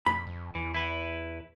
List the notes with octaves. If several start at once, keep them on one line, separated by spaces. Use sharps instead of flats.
F2 B5
F2
E2 E3
E4 B4